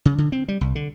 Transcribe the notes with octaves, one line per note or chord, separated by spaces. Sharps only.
C#3
D3
C4
G3
C2
D3